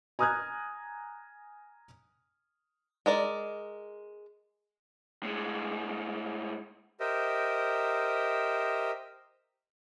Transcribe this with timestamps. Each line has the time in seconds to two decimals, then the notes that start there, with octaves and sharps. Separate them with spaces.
0.19 G#5 A#5 D#6 F6 F#6 G#6
3.06 G#3 A#4 D5
5.23 A2 G#3
7.00 G4 A#4 C5 D#5 E5